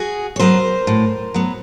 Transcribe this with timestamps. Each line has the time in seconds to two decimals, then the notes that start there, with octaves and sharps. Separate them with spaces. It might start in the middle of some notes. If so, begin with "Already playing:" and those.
Already playing: F#4 G#4
0.36 C#5
0.39 F#3 B3 A#4 C5
0.87 A2
1.34 F#3 B3